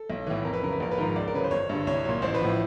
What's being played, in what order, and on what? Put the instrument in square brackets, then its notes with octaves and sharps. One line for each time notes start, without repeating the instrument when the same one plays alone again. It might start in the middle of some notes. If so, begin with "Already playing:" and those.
Already playing: [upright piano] A4
B1
A2 E3
F2 A#4
B4
C#3 F#3 A#4
B4
A#1 A#4
B4
G#2 F3 A#4
C#2 D5
A#4
C#3 F#3 B4
C5
G1 C#5
G2 D3
C2 C#5
A#2 F#3
A1 C5
B4
A2 F3